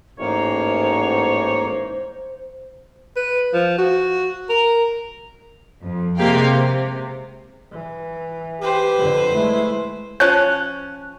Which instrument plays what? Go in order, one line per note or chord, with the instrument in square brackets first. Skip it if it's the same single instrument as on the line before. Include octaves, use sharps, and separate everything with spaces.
[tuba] A1 [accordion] G#2 A#3 [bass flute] C5 [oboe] C#5
[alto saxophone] B4
F3
F#4
A#4
[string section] F2
C3 G#3 A#3 G4 F5 G5
C3
[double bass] E3
[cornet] G4 [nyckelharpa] B4 C5
[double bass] F2 D3
[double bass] G#3 A3 [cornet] E4
[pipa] F3 C#4 [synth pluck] F#6